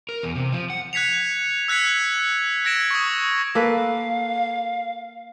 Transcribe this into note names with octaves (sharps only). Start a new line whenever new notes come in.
A#4
E2
C3
F3
F#5
F#6 G#6 B6 C#7 F7
E6 F#6 G#6 B6 C#7
E6 G#6 A#6 D7 E7
C#6 D#6
A#3 A4 B4 F5